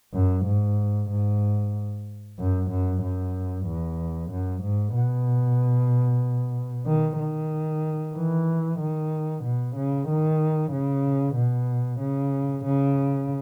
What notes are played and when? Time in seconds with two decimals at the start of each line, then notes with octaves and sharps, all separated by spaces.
0.13 F#2
0.45 G#2
1.10 G#2
2.39 F#2
2.71 F#2
3.02 F#2
3.66 E2
4.31 F#2
4.63 G#2
4.94 B2
6.86 D#3
7.20 D#3
8.15 E3
8.79 D#3
9.44 B2
9.76 C#3
10.08 D#3
10.72 C#3
11.35 B2
12.00 C#3
12.64 C#3